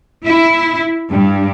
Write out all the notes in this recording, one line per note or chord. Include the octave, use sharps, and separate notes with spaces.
E4
G2